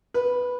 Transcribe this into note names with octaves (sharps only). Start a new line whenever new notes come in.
B4